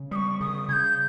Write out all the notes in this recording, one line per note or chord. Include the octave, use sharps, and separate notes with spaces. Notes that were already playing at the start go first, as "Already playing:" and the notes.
Already playing: C#3
G3 C#6 D#6
C#3 D#6
C#3 G6 G#6